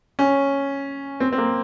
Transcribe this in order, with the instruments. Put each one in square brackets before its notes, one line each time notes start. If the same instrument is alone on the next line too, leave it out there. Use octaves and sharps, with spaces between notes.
[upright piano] C#4
C4
C4
A#3